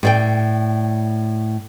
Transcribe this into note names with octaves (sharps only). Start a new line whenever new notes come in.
A2 D5 G5